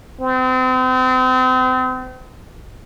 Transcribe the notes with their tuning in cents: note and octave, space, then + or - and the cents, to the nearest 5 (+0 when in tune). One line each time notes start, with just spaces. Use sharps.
C4 -35